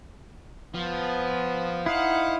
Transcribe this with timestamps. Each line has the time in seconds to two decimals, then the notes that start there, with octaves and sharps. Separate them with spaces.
0.75 F3 B3
1.86 D#4 E4 C5 D#5 F5 F#5